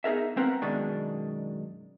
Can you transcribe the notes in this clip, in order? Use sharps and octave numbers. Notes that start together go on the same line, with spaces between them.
B3 D#4 G#4 A#4 E5
C4 A#4 B4 F5 F#5 A#5
F#2 B2 D#3 G#3 D4